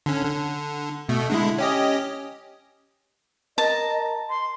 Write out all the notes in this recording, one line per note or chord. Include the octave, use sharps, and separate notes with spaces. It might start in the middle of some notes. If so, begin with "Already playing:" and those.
D3 C#4
D3
B2 A3
D3 G#3 E4
C#4 G4 D#5
A#4 D#5 A5
C6